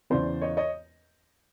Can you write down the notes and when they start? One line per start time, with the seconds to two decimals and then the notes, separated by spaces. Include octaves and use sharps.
0.10 E2 C#3 E3 C5 D5
0.41 C#5 D#5
0.57 C#5 D#5